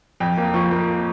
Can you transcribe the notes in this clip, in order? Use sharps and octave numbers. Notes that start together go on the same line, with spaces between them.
F2 G5
A#3
F3 C#6
A#3